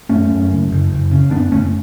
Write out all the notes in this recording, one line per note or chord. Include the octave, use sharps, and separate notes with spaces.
F#2 A3 C#4
F#2
F#1
F#1
F#1
C#3
F#1 B3 D4
F#1 A3 C#4